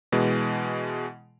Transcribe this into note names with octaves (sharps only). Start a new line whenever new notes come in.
B2 E3 G#3